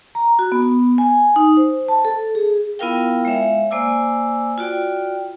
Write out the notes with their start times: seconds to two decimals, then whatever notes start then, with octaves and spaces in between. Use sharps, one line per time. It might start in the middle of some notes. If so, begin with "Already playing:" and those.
0.15 A#5
0.39 F#4
0.52 B3
0.98 G#5
1.36 D#4
1.57 C5
1.88 A5
2.05 A4
2.35 G#4
2.79 B3 E4 F4 A#4 F5 G5
3.25 G#3 C#5 E5 F5
3.71 A#3 C5 D5 G#5 D6 E6
4.58 F4 F#4 D5 G5